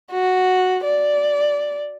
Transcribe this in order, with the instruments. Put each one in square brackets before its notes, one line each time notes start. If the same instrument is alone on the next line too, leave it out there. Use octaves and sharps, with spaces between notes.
[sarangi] F#4
D5